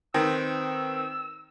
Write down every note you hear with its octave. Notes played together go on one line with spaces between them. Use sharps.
D#3 C4 B4 E6